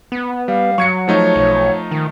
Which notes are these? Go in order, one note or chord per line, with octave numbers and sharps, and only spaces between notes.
B3
G3 F5
F#3 C#6 G#6 C#7
F3 A3 D#4 C#5
B1
D#3